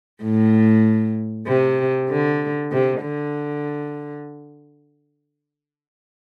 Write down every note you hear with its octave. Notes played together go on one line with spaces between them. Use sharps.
A2
C3
D3
C3
D3